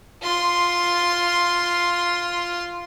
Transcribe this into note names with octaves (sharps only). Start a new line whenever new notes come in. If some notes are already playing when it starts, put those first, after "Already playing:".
F4 C6